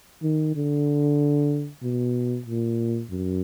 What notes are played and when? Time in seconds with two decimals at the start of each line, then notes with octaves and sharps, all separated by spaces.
0.22 D#3
0.55 D3
1.83 B2
2.46 A#2
3.10 F#2